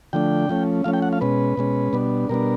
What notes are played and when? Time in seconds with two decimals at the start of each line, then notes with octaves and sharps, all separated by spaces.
0.13 D3 F3 A3 D4 G5
0.49 F3 A3 C#4
0.84 F3 A3 C#4 F5
0.93 G5
1.02 F#5
1.13 F5
1.21 B2 G#3 C#4 B4
1.57 B2 G#3 C#4
1.93 B2 G3 B3 D4
2.29 B2 G3 B3 D4 A#4